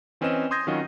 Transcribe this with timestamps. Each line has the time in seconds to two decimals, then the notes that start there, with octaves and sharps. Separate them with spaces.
0.21 E3 C4 C#4 B4 D#5 E7
0.51 C6 D#6 G6 G#6 A#6
0.67 D#3 F#3 C#4 F4 F#4 D#5